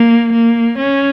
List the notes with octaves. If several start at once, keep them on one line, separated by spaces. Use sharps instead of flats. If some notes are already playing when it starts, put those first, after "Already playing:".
Already playing: A#3
A#3
C#4